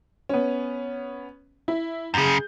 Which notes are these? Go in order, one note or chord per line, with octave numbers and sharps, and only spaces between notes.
B3 C#4
E4
F#2 C#3 G#4 G6